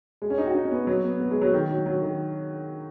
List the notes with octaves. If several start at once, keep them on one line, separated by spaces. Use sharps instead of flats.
G#3
C#4
D#4
F#4
D#4
C#4
B3
F#3
B3
B3
G#3
F#3
D#3
F#3
F#3
D#3